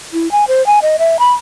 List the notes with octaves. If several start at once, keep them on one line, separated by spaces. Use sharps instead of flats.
E4
G#5
C5
G#5
D#5
E5
B5